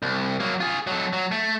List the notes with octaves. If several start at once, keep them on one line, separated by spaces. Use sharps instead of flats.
C2
F#3 A#3
F4 G#4
F#3 A4
F#3
A3